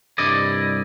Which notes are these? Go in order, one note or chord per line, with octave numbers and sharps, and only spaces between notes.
C2 G2 E4 D5 D#5